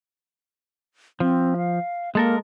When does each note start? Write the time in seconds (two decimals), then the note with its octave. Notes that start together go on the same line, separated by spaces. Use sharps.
1.20 F3 C4
1.57 F5
2.15 G#3 A#3 A4 A#4